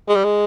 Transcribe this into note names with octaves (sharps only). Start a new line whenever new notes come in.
G#3
G3
G#3